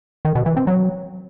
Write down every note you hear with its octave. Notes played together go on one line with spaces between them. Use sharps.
D#3
B2
E3
C4
F#3